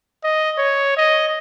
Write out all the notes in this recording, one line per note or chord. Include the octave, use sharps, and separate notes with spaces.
D#5
C#5
D#5